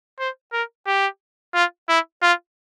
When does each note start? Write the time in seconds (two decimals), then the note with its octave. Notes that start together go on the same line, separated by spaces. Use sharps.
0.19 C5
0.53 A#4
0.87 G4
1.54 F4
1.89 E4
2.22 F4